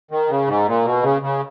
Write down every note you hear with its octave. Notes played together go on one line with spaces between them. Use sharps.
D#3
C#3
G#2
A#2
B2
C#3
C#3